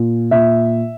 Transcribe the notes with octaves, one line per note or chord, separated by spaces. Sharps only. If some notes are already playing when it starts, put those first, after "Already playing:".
Already playing: A#2
A#2 E5